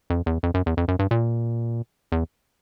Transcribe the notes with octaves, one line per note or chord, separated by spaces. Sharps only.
F2
E2
F2
F#2
E2
F2
F#2
G2
A#2
E2